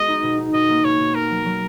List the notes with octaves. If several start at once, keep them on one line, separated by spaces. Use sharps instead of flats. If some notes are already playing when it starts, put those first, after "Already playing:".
Already playing: G#3 B3 F#4 D#5
D#4
B2
D#4
B2 D#5
A#3
B2 C#5
B2
F#4 A#4
F#3
F#3